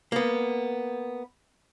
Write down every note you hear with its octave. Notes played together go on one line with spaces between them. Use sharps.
A#3 B3